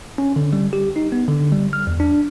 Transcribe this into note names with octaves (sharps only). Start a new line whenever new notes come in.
C#4
D3
G3
G4
D#4
B3
D3
G3
F6
E2
D4